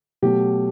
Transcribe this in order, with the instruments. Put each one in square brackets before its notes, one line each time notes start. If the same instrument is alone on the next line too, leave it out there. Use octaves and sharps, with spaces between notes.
[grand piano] B2 F#3 A3 G4